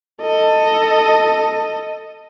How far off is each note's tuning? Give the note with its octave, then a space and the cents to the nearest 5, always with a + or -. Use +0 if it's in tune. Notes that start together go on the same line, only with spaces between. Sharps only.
A4 +15 D#5 +0